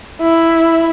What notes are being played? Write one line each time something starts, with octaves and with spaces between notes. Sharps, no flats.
E4